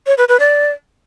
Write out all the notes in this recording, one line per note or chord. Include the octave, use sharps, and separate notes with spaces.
C#5
B4
B4
D5